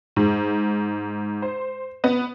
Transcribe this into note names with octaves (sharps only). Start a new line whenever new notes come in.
G#2
C5
B3